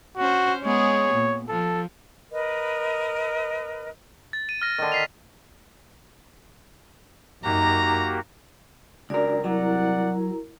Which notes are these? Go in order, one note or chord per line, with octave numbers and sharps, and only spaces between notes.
C#4 F#4 C5
G#3 B3 G#4 C#5
A#2
F3 A4
A#4 B4 D#5
A6
D#7
F6 A#6
D3 D#3
B6 C7 F7
F#2 A#3 D#4 F#4 G4 A#5
C#2 D4 F#4 A#4 D5
C2 F#3 E4 A#4 D5 F#5 A#5